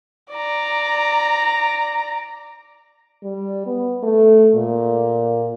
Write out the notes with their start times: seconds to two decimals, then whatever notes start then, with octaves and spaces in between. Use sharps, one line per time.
0.32 D5 A#5
3.24 G3
3.66 B3
4.03 A3
4.55 A#2